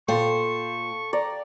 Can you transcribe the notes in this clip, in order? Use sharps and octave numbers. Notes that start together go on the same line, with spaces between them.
A#2 A4 C5 F5 G5 C#6
D5 A#5